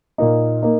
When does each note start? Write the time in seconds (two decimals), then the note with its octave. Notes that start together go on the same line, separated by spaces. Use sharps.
0.18 A#2 A#3 D#4
0.62 A#3 D#4